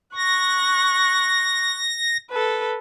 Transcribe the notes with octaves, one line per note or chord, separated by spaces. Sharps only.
C#6 F#6 A#6
A4 B4